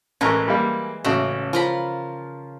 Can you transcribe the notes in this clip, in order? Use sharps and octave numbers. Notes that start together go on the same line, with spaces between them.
A1 E3 G#3 A#4 C#6
G3 A#3
A1 C#3 F#4 E5
F3 F4 A#4 B5